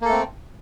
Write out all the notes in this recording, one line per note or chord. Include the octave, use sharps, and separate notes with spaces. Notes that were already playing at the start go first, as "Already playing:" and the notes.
A3 A#3 C4 A4